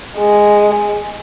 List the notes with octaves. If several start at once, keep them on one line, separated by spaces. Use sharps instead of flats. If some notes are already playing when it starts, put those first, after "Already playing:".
G#3